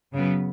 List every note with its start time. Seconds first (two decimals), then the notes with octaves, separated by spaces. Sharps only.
0.12 F#2 C#3 F#3 B3